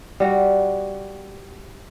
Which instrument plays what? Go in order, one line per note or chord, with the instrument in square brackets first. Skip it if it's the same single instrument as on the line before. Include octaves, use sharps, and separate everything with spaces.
[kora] G3 F#4